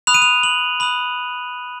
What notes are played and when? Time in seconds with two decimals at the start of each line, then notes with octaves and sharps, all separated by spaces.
0.07 B5 D#6 F#6 F7
0.14 D#7
0.22 F7
0.43 F#7
0.80 B5 D#6 F#6 F#7